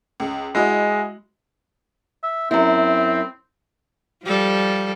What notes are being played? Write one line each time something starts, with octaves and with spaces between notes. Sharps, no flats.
C#2
G#3 E4 F#4 D#5
E5
F#2 C4 E4
F3 G3 A4